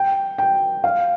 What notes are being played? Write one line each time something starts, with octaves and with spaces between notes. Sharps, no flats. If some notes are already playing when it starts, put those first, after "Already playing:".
Already playing: G5
G5
F5